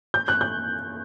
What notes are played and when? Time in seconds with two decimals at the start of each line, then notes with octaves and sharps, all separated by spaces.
0.14 G6
0.28 F#6
0.41 G6